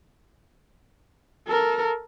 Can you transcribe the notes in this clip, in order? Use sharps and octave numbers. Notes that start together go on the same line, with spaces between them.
A4 A#4